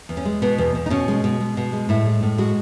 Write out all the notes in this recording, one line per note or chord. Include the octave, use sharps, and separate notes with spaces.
E2
C#4
G#3
B2 B3
E2
E2
D#4
B2 C#4
G#3
B2
G#3
B2
G#3
A2 E4
G#3
A2
G#3 F#4